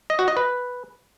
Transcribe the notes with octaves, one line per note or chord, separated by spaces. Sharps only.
D#5
F#4
D#5
B4